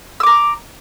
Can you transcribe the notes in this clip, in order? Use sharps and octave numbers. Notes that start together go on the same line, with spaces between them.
A#5 D6 E6